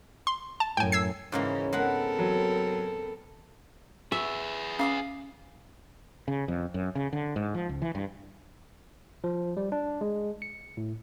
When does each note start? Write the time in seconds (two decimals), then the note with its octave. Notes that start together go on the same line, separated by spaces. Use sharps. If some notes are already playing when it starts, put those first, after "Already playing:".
0.27 C6
0.60 A5
0.77 F#2 A2 G5 G#5
0.92 E6 G#6 C7
1.32 G#2 C#3 E3 A#3 C#4 D#4
1.73 G#3 B3 C4 A4 A#4 F#5 B5
2.19 F#3
4.12 G#4 B4 E5 C#6
4.79 C#4 F5 D6 D#6
6.28 C#3
6.48 F2
6.74 F#2
6.95 C#3
7.13 D3
7.36 G#2
7.54 F3
7.69 C#2
7.82 E3
7.95 G2
9.24 F3
9.57 G3
9.72 D4
10.01 G#3
10.42 C#7
10.77 A2